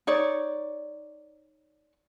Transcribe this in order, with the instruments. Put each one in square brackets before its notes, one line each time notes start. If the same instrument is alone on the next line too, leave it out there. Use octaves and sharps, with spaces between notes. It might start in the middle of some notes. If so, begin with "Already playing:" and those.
[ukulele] D#4 C#5 D5